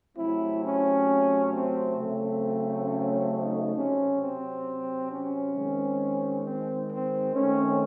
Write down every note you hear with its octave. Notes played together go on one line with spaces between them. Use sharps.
C3 F#3 A3 C4 E4
C#4
C4
C#3 F#3 A3 C4
C#4
D#4
C3 F#3 C4 C#4
C4
C#4
D#3 G#3 C4
C4
C4
D#3 A3 C4 C#4